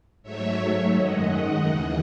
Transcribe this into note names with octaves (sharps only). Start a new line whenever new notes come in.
G#2 F#3 A3 C#5 E5
F#2 D#3 G#3 D#5 F#5
D#2 C#3 E3